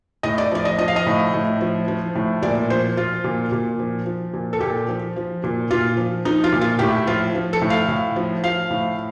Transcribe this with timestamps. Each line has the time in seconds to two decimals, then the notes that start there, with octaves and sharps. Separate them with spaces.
0.23 A2 D#5
0.38 D5
0.51 F3 D5
0.65 D#5
0.79 F3 D#5
0.88 F5
0.96 D#5
1.06 A2
1.34 A2
1.61 F3
1.88 F3
2.15 A2
2.42 A#2 D5
2.70 F3 C5
2.97 F3 F4
3.24 A#2
3.52 A#2
3.79 F3
4.06 F3
4.33 A#2
4.53 A4
4.61 A#2 G4
4.88 F3
5.16 F3
5.44 A#2
5.71 A#2 F4
5.97 F3
6.25 F3 D#4
6.44 F4
6.52 A#2
6.61 F4
6.79 A2 G4
7.07 F3 F4
7.35 F3
7.53 A4
7.61 A2
7.70 F5
7.88 A2
8.16 F3
8.44 F3 F5
8.70 A2